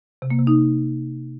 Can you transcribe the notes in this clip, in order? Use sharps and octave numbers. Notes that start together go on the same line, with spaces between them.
C3
A#3
C3
D#4